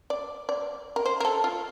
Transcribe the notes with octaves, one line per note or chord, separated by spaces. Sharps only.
D5
D5
A#4
C5
A#4
A4
F4